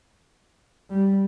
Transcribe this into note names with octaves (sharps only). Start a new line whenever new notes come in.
G3